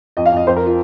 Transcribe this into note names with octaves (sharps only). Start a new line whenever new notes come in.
F2 D#5
F5
F2 D#5
F2 C5
A#4
F4